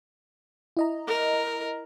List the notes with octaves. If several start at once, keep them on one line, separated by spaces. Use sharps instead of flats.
E4 D#5 A#5
A#4